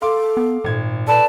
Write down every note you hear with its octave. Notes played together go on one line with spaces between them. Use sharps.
A4 F5 C6 D6
B3
G#1 A#2 G#6
A4 B4 D5 A5